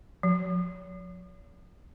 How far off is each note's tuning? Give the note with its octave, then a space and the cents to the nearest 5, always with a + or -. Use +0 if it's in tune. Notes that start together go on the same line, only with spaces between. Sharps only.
F3 +45